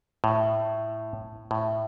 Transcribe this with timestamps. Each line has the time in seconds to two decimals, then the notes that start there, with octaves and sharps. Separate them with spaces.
0.24 A2
1.51 A2